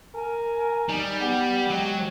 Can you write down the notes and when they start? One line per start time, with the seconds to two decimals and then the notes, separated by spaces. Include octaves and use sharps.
0.14 A#4 G#5
0.89 G3 D#4
1.20 B3 G4
1.70 F#3 G#3 G5